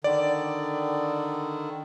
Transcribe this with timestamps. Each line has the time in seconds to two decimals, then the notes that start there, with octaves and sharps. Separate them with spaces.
0.04 D3 D#3 D5